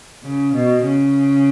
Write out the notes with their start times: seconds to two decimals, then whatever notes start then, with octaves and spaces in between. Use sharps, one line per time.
0.24 C#3
0.54 B2
0.84 C#3